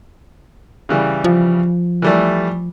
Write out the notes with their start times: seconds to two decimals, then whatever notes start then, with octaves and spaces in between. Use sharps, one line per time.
0.89 C#3 E3 G3
1.24 F3
2.02 E3 G3 A3